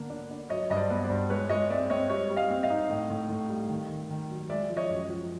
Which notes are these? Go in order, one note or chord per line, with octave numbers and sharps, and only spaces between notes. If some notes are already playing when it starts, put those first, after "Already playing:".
Already playing: D3 A#3 B3
D4
D4
F#3 C#5 D#5
G2 D#5
C5 D5
B3
C5 D5
G2
G#3 B4 C#5
G#3 C#5 D#5
C4 D5 E5
C4 C#5 D#5
G3 C#5 D#5
G3
D#5 F5
C4
D#5 F5
D#4
A2
A2
A2
G3
D#3
D#3
D#3
F#3
G#3 D5 E5
F3
C#5 D#5
F#2
F3